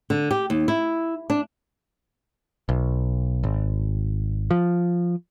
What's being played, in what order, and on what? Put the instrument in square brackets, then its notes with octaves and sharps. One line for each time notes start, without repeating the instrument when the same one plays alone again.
[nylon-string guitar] D3
G4
D#2
E4
D4
[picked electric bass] B1
G#1
F3